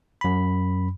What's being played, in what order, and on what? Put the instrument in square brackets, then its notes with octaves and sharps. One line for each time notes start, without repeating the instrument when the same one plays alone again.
[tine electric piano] F#2 B5